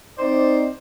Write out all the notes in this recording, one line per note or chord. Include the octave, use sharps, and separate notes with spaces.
C4 D#4 C5 D5